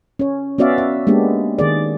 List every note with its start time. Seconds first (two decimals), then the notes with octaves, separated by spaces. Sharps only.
0.19 C#4 C#5
0.58 B3 C#4 F#4 D5 E5 F5
0.78 E5
1.07 G#3 A#3 B3 D4 G4
1.59 D#3 G#4 D5